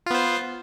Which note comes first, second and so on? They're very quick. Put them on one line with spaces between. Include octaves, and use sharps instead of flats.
F4 B3 C5